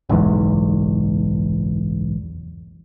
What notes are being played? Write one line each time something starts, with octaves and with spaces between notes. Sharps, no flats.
F#1 B1 E2 G#2